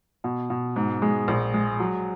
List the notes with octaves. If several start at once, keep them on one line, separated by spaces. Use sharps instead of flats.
B2
B2
G#2
G#3
A#1
G#3
F#3